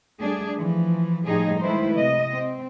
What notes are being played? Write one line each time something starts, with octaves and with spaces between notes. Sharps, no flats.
G3 A3 D4 G#4
E3 F3
A2 F3 G3 D#4 G4 G#4
D#3 G#3 A3 E4 B4 C5
C3 D#5
C4